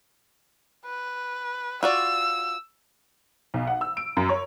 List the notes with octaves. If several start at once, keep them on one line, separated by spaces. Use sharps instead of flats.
B4
F4 F#4 D5 E6
B1
F#5
E6
D7
F#2
C#5